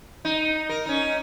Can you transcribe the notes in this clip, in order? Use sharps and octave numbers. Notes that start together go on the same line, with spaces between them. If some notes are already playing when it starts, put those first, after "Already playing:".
D#4
A#4
C#4 D#4